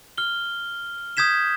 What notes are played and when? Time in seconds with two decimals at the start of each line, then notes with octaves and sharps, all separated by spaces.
0.18 F6 G7
1.17 D#6 G6 G#6 B6 E7